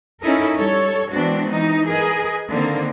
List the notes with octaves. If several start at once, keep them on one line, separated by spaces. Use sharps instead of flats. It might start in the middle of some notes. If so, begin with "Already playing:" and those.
C#4 D#4 E4 A4 A#4
G3 A4 C#5
E3 G#3 B3 C4 D4 F#4
E3 D#4
G#4 A#4 B4 D#5
D3 D#3 A#3 C4